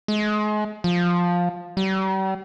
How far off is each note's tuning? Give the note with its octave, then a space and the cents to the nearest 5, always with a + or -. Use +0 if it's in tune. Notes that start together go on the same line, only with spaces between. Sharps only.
G#3 +35
F3 +10
G3 -40